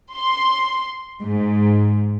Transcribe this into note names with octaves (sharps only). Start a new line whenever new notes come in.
C6
G#2